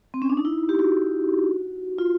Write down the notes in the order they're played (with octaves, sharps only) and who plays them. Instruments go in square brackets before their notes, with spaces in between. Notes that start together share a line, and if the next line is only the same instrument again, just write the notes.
[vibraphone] C4
C#4
D4
D#4
E4
G4
F#4
F4